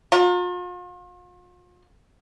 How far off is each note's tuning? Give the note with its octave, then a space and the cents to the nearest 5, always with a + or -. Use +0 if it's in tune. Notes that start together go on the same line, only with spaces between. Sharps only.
F4 +40 A#5 -20